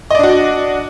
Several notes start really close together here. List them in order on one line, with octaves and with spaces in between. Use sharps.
D#5 D5 D4 F#4